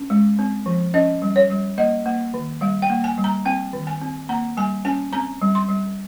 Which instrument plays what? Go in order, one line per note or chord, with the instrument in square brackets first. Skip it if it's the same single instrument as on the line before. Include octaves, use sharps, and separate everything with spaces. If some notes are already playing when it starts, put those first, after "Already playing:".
Already playing: [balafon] C#4
G#3
C4
F3
C#4 D#5
G3
C#5
G3
A#3 D#5
A#3
D#3
G3 F5
G5
A#3
G#5
G3
A#5
C4 G5
D#3
G#5
C4
A#3 A#5
G3 G#5
C#4 G#5
C4 A#5
G3
C6
G3